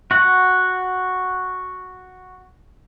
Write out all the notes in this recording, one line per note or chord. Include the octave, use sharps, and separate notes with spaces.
F#4 F#5